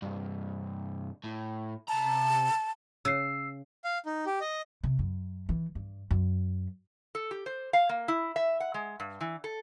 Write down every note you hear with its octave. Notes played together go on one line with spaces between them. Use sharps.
C2 G2
A2
C3 A5 A#5
C#3 E6 C7
F5
D#4
G4
D#5
C3
F#2
E3
G2
F#2
A4
G4
C5
F5
A#3
E4
E5
F#5
G#3
G2
E3
A4